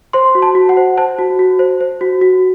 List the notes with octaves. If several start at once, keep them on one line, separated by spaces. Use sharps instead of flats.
C5 C6
F#4
A5
F#4
F#5
C5
C5 A5
F#4
F#4
C5
C5
F#4
F#4